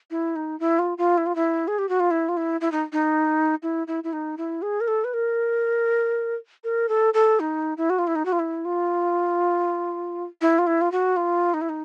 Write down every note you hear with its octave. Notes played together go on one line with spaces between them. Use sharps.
E4
D#4
E4
F4
F4
E4
F4
E4
G#4
G4
F#4
F4
E4
F4
E4
E4
D#4
D#4
E4
E4
E4
D#4
E4
G#4
A#4
A4
B4
A#4
A#4
A4
A4
D#4
E4
F#4
F4
E4
D#4
F#4
F4
E4
F4
E4
F4
E4
F4
F#4
F4
D#4
E4
D#4